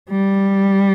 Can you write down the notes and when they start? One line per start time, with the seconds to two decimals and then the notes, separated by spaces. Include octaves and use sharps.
0.11 G3